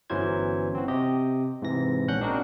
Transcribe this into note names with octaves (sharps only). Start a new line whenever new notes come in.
G1 E3 F#3 C#4 C5 G#6
C4 F#4
C3 G4 D#5
G#2 C3 E3 A#6
A#1 C#4 D4 F#5 F#6 G6
C4 D4 D#4 F#4 G#4 A#4